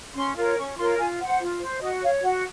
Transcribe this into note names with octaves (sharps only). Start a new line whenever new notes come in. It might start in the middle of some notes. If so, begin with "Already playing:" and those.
C#4 C6
F4 A#4 C#5
C#4 C#6
C#6
F4 A#4 C#5 C6
F4 G#5
C5 F#5
F4
C5
F#4 D#5
C#5 F5
F#4 F#5